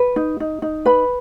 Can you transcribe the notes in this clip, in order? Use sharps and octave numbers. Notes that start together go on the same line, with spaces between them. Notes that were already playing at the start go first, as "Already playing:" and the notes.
Already playing: B4
D#4
D#4
D#4
B4 B5